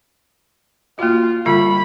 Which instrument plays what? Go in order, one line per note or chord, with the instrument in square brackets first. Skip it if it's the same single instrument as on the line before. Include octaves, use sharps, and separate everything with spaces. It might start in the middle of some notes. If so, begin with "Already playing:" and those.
[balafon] A#3 F#4 [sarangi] F4
[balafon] D3 G3 F4 [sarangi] B5